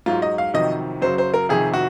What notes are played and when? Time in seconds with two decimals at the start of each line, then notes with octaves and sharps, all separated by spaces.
0.06 G#2 F#3 F4
0.22 D#5
0.38 F5
0.54 F2 C3 D#3 F#3 D#5
1.02 F#2 C#3 F#3 C5
1.18 C5
1.34 A#4
1.49 F2 C3 D#3 G#4
1.74 F#4